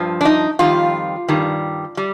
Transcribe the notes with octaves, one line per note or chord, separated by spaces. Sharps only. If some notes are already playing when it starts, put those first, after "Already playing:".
Already playing: G2 F3
D4
D#4
F2 D#3 G3 F4
G2 D#3 G3
G3